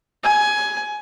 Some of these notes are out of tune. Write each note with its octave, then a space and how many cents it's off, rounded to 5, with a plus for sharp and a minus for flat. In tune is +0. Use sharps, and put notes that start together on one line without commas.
G#5 +15